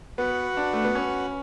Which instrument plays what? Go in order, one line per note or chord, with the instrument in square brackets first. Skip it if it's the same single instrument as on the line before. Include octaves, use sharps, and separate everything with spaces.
[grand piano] B3 [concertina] F#4 B4 F#5
[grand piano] D4
A3
B3
C#4